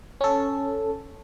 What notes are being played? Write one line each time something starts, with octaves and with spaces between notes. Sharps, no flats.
C#4 A4